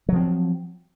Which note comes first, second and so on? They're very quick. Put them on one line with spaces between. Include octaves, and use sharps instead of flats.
F#3 F3 C4